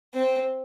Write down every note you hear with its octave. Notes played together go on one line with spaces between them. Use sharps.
C4